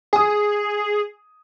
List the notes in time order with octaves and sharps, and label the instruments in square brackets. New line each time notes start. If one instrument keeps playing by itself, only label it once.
[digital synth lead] G#4 [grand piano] G#5 D#6